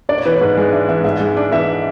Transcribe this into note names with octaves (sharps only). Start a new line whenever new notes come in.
D4 D5
C#5
E3 B4
C#5
G#2
G#3
D4 E5
E3 E5
G#2 E5
G#3
D4
E3 E5